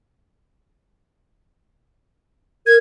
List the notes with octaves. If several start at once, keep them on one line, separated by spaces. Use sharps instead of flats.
A#4 G#6